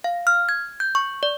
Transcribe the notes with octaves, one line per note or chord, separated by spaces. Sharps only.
F5
F6
G#6
G6
C#6
D5